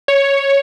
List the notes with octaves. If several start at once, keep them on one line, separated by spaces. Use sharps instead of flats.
C#5